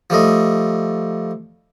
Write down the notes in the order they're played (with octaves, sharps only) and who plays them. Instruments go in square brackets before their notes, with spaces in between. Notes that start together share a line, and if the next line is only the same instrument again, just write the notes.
[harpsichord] F3 G3 A3 D#5